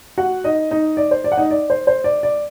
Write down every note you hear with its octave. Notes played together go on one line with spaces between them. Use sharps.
F#4 F#5
D#4 D#5
D#4 D#5
D5
C5
D5
F#5
D#4 D#5
D5
C5
C5
D5
D5